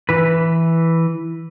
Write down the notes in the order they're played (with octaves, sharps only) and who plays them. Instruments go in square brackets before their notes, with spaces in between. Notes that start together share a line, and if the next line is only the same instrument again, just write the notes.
[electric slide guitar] E3 B4